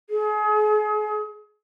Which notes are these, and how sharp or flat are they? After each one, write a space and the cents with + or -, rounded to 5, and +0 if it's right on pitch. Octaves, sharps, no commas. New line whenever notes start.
G#4 +35